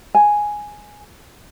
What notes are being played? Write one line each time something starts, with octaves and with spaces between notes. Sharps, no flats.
G#5